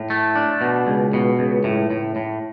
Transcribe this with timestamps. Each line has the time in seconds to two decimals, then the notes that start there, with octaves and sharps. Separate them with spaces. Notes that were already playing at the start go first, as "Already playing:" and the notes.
Already playing: A2
0.10 A3
0.35 D4
0.61 B2
0.87 C#2
1.13 B2
1.39 C#2
1.64 A2
1.91 A2
2.16 A2